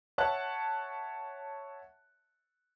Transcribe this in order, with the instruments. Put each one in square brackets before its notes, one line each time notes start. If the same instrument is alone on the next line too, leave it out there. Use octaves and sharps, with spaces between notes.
[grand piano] C#5 E5 F#5 A5 F#6